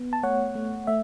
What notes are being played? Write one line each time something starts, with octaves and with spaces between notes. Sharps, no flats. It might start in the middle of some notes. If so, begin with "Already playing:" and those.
Already playing: B3
A5
A3 C#5 F#5
A3
A3 E5